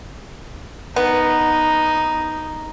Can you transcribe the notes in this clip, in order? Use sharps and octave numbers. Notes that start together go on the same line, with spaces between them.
B3 D#4